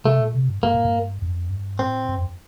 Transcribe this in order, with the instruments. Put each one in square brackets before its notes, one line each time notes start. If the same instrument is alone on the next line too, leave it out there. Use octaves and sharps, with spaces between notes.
[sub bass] C3 [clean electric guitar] A3
[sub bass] A#2
C3
G2
[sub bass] G2 [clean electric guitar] A#3
[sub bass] A2
G2
F2
G2
[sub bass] A2 [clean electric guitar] C4
[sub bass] G2
F2